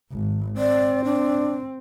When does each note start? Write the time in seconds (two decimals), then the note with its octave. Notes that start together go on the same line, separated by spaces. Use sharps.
0.12 G#1
0.58 C4 D5
1.05 D4